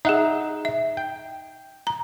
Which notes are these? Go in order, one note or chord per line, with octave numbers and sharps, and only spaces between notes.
D#4 G#4 E5 F#5
E5
G5
A#5